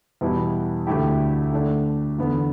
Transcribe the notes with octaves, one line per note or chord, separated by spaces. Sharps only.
E2 B2 G3 B3 E4
D2 D3 A3 E4 G4
D3 A3 D4
E2 D3 B3